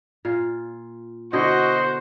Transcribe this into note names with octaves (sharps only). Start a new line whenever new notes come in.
A#2 F4
B2 D3 E4 F#4 C5 D#5